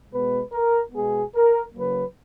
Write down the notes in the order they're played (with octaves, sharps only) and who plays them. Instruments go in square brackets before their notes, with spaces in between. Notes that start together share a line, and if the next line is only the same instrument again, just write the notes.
[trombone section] B2 G#3 B3 B4
A#4
B2 G#3 B3 G#4
A#4
C#3 F#3 A#3 B4